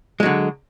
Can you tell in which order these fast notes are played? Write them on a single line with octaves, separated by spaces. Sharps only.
G#3 F#3 D3